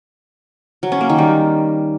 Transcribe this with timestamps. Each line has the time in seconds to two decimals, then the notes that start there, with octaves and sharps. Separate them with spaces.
0.83 F#3
0.92 C#4
1.01 A#3
1.10 D#3
1.18 G3